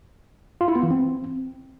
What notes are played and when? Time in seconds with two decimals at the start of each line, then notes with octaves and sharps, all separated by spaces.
0.61 F4
0.68 E4
0.76 B3
0.83 E3
0.91 C4